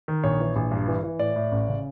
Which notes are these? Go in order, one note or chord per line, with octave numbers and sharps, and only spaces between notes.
D#3
A#1 C#5
E3
A#1
G2
E3
E3
A2 D5
A2
A1
C#3